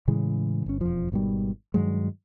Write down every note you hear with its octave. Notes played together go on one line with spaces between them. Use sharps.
A2 C#3 E3 G#3
G1 C#4
E1 F2 F3
G#1 B2 D#3 G3
G2 D#3 F#3 G#3